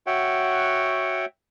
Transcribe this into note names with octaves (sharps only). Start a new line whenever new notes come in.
F#4 C#5 E5 F#5 G5